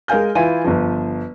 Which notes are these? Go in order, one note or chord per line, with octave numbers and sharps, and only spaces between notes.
G#3 A#4 F5 G#5 G6
E3 E4 F4 G#5 D#7
G1 F3